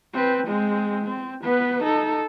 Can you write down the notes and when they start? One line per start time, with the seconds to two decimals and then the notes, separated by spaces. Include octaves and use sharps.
0.14 C4 B4
0.47 G#3 C4
1.05 C4
1.43 B3 B4
1.84 D#4 A4